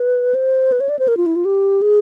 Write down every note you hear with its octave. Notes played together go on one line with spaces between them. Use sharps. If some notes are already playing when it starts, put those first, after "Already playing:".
Already playing: B4
C5
B4
C#5
D5
C5
A#4
F4
E4
F4
G4
G#4